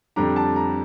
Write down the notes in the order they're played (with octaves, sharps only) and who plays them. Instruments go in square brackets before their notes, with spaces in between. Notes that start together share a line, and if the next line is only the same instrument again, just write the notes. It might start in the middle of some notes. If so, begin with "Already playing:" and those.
[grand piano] F2 D3 G3 D4 A#5
A5
A#5